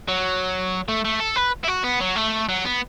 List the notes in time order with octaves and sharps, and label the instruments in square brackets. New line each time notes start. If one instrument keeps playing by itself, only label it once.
[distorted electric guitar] F#3
A3
A3
A4
B4
E4
F#4
B3
F#3
A3
F#3
B3